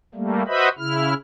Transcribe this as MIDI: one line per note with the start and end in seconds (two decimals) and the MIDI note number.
0.15 0.43 55
0.15 0.43 57
0.15 0.43 58
0.48 0.69 66
0.48 0.69 71
0.48 0.69 72
0.48 0.69 75
0.48 0.69 76
0.48 0.69 83
0.78 1.14 49
0.78 1.14 64
0.78 1.14 89